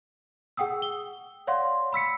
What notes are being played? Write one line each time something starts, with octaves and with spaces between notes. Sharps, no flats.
G#4 F#5 G5 D#6 E6
G7
C#5 D5 F5 F#5 C6
B5 E6 B6 C#7